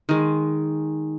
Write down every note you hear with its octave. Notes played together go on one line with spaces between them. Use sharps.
D#3 G#3